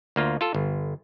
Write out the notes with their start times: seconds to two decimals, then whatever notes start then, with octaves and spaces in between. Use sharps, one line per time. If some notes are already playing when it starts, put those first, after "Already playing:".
0.16 D2 A#3 F4
0.41 F4 A4
0.55 G1